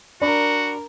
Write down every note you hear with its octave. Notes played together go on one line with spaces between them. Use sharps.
D4 F#4 A#4 D5 B5